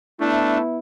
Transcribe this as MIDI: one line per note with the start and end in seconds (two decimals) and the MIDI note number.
0.20 0.61 57
0.20 0.78 59
0.20 0.58 62
0.20 0.78 64